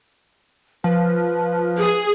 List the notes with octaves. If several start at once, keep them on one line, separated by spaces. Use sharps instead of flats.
F3 B4
G#4